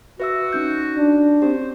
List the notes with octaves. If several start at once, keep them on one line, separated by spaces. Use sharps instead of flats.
F#4 B4 E5 E6
C#4 D#4 G6
D4
C4 C#4 G4 C5